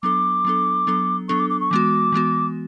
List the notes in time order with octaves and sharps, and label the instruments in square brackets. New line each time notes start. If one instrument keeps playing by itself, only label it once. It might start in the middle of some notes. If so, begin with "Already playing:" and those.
[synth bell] F#3 B3 D4 A4 [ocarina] D6
[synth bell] F#3 B3 D4 A4
F#3 B3 D4 A4
[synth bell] F#3 B3 D4 A4 [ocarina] C#6
[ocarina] D6
D6
C#6
[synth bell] E3 G#3 B3 F#4 [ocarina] D6
[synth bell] E3 G#3 B3 F#4